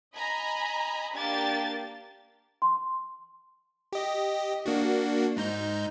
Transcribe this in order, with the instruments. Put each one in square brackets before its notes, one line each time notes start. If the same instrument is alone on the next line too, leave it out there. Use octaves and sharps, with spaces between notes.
[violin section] D#5 G#5 A#5 B5
A#3 D4 G4 A6
[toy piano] C6
[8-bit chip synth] G4 D#5
A#3 D4 F#4
G#2 D#4 G6